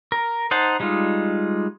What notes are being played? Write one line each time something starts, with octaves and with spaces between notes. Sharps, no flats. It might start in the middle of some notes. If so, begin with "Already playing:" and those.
A#4
D#4 C5 F#5 A5
G3 G#3 D#4 F4